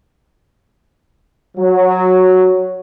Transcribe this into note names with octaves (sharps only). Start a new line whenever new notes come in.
F#3